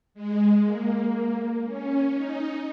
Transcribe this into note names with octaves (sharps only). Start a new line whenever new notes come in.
G#3
A#3
C#4
D#4